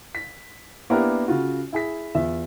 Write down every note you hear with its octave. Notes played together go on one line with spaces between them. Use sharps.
B6
A#3 B3 D4 E4 G4 A#4
C#3 F4 F#4
E4 G#4 B6
E2 F4 E5